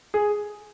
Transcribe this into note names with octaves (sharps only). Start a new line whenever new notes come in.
G#4